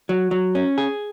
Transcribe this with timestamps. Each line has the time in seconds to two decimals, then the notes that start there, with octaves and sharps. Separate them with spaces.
0.09 F#3
0.31 F#3
0.55 C#4
0.78 G#4